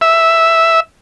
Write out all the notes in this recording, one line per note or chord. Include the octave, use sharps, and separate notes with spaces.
E5